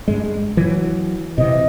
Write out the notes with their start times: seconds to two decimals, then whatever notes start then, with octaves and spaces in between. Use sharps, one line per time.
0.08 G2 G#3
0.57 E3 F#3
1.38 C3 E3 D#5